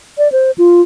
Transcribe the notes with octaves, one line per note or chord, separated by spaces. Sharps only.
D5
C5
F4